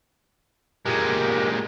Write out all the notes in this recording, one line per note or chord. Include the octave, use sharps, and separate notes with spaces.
A#2 G#3 G4 A#4